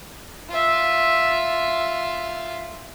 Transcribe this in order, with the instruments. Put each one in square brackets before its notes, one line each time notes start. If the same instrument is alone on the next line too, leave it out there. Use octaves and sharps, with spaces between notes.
[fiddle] F4 E5